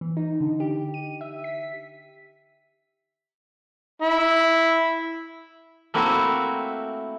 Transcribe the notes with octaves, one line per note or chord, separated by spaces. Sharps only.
E3
D#4
D3
G4
D#7
E5
B6
E4
A3 A#3 C4 E4 F#4